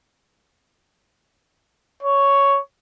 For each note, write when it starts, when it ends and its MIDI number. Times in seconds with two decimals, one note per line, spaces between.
2.03 2.59 73